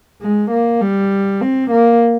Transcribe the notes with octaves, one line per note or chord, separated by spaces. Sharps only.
G#3
A#3
G3
C4
A#3